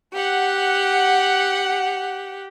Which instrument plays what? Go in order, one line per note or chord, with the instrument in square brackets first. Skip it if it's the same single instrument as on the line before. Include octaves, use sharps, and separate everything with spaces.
[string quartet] G4 [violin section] F#5